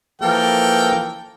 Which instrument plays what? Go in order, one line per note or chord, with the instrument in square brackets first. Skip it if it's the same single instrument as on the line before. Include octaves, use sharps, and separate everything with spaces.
[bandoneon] E3 F3 A#3 [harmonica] A4 A#4 G5